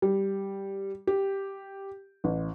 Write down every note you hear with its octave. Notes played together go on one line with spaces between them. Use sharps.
G3
G4
A1